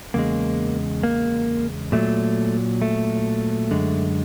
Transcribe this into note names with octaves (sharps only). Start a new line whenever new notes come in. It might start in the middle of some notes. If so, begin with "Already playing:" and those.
E2 C#3 G#3 A#3
A#3
A#2 F#3 A3
A3
F#2 D3 G#3